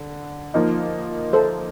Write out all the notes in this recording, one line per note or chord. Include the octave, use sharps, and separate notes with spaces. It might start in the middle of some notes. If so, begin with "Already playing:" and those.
Already playing: D3
F3 A#3 D#4
A4 C5